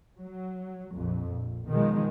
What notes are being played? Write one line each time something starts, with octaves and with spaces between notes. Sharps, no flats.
F#3
A#1 F2
A#1
B2 D#3 F3 G#3